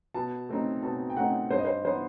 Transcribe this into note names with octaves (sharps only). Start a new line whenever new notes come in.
B2 A5
A3 C4 D#4
B2 A5
G5
A3 C4 D#4 F#5
G2 C5
D#5
C5
E3 B3 D#4 C5